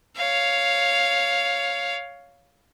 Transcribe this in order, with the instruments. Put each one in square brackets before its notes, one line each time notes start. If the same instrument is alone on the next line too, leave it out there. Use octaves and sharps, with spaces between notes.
[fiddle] C#5 F5